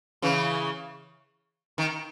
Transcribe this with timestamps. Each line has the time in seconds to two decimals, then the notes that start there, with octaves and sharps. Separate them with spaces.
0.22 C#3 E3
1.78 D#3